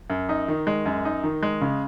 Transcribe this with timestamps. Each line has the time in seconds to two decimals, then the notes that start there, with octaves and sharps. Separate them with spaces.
0.10 F#2
0.29 D#4
0.48 D#3
0.67 G#3
0.86 F#2
1.05 D#4
1.24 D#3
1.43 G#3
1.61 C#3